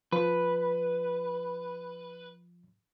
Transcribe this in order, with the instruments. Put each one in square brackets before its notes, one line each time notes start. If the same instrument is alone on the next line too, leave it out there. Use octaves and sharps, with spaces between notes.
[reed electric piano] F3 [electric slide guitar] B4